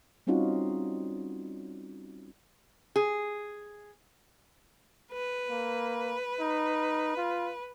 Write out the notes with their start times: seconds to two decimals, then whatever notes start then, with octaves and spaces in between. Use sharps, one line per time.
0.27 G3 C4 C#4 D#4 F4 F#4
2.96 G#4
5.12 B4
5.50 A#3
6.40 D#4
7.17 F4